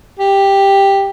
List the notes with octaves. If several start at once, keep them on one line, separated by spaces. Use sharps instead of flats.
G4